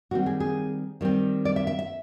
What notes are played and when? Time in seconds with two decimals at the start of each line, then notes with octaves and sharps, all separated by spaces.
0.11 D#3 G3 C4 F#4
0.26 G#4
0.40 G#4
1.01 D#3 G3 C4
1.45 D5
1.56 E5
1.67 E5
1.79 E5